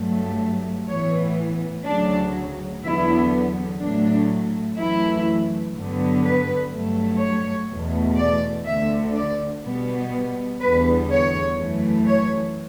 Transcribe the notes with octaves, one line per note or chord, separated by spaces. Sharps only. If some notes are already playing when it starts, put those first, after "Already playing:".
Already playing: G2 F#3 A3
A2 E3 B3 C#5
D2 C#3 F#3 D4
E2 D3 F#3 B3 E4
A2 F#3 A3 D4
F#2 E3 A3 E4
G2 D3 F#3 B3
B4
G2 F#3 A3
C#5
E2 B2 A3
D5
D2 D3 A3 E5
D5
B2 G3 B3
E2 D3 G3 B3 B4
C#5
F#2 E3 A3
C#5